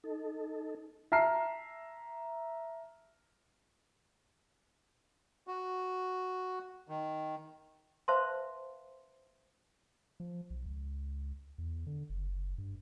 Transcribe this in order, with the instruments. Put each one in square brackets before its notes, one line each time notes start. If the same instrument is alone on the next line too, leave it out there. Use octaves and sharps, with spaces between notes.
[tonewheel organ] D#4 A4
[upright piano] E5 A5 A#5 F6 C7
[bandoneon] F#4
D#3
[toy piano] B4 C5 E5 F5 A5 C6
[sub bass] F3
B1
C#2
E2
D3
F#1
G2